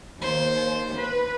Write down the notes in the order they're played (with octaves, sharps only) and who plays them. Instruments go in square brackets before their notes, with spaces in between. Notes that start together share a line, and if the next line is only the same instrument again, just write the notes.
[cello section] D#2 [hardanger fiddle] C5
[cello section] B4